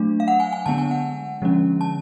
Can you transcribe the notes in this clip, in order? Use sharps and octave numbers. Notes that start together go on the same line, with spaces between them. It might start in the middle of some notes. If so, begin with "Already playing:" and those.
Already playing: F#3 A3 D4
F5
F#5
G#5
G#5
D3 G#3 B3 D4 A5
G#5
F#5
D3 F3 G#3 C#4
A5